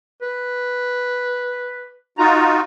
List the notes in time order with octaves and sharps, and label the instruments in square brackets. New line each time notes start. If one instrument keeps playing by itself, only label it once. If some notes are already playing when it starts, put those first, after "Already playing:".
[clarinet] B4
[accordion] D#4 F4 F#4 [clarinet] A#5